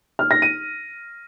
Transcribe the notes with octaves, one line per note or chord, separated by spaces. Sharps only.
F6
A#6
D#7